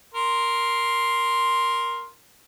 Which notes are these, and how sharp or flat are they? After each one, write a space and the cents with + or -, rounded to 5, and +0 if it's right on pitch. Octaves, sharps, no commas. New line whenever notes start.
A#4 +0 C6 +5